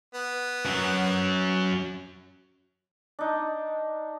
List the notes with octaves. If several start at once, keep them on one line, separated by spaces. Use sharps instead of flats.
B3
F#2 F#3
D4 D#4